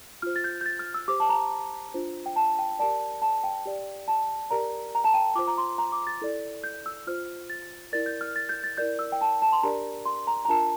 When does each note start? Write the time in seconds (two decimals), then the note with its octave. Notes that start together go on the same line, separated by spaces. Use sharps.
0.22 F4 C5 F6
0.36 A6
0.44 G6
0.61 G6
0.66 A6
0.79 F6
0.94 E6
1.08 G4 C5 D6
1.20 A5
1.29 A#5
1.94 D4 F4 C5
2.26 G5
2.36 A5
2.59 G5
2.79 G4 A#4 D5 A5
3.22 A5
3.44 G5
3.65 G4 D5
4.08 A5
4.50 G4 A#4 D5 A#5
4.95 A#5
5.04 A5
5.14 G5
5.35 F4 C5 D6
5.47 A#5
5.58 C6
5.78 A#5
5.92 D6
6.07 A6
6.21 E4 A4 D5
6.64 G6
6.86 E6
7.07 F4 C5 F6
7.50 A6
7.93 E4 A#4 D5 A6
8.06 G6
8.21 F6
8.36 A6
8.49 G6
8.64 A6
8.77 E4 A#4 D5 G6
8.99 E6
9.12 G5
9.21 A5
9.42 A5
9.52 C6
9.63 D4 G4 A#4 D5 A#5
10.05 C6
10.27 A#5
10.45 A#5
10.48 D4 F4 A#4 A5